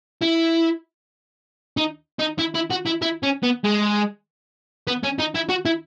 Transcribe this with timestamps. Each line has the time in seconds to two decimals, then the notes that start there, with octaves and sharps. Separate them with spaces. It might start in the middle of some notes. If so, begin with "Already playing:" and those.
0.22 E4
1.77 D#4
2.20 D#4
2.39 E4
2.55 E4
2.71 F#4
2.86 E4
3.02 E4
3.23 C#4
3.43 B3
3.64 G#3
4.87 B3
5.03 C#4
5.19 D#4
5.35 E4
5.49 F#4
5.66 E4